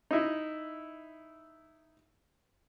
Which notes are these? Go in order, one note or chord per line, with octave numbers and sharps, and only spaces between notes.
D#4 E4